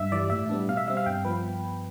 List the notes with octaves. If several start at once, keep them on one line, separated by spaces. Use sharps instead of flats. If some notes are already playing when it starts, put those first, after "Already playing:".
Already playing: G2 E5
E3 G3 D5
A2 E5
G3 B3 D4
B2 F5
E5
G3 C4 E5
F5
G2 G5
F3 B3 B4